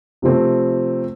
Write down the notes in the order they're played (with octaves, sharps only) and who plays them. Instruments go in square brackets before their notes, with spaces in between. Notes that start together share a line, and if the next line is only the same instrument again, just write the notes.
[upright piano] C3 F3 A3 C4